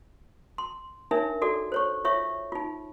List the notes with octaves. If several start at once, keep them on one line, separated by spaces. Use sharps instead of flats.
C6
D4 D#4 A#4 C#5 E5
F#4 A4 D5
C5 C#5 C#6
F4 C#5 E5 C#6
D#4 F4